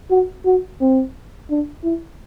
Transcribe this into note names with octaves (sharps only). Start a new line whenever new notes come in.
F#4
F#4
C4
D4
E4